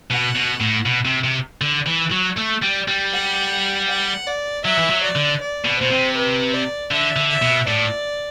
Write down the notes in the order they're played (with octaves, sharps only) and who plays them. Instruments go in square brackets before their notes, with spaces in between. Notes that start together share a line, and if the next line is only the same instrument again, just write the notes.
[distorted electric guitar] B2 [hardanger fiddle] F#5
[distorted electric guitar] B2
A2
B2
C3
C3
D3
E3
F#3
A3
G3
G3
[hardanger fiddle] F#5
F#5
D5
[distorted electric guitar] F#3 [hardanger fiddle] E5
[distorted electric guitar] E3
F#3
[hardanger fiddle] D5
[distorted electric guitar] D3
[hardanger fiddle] D5
[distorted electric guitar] B2
[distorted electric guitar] B2 [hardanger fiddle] C5
[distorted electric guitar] C3
[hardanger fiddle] B4
D5
[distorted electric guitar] D3 [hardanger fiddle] E5
[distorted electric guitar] D3
[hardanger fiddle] E5
[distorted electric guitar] B2
[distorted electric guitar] A2 [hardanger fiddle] D5